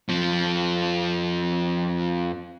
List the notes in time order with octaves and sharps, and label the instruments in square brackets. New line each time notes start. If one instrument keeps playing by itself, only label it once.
[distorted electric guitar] F2 F3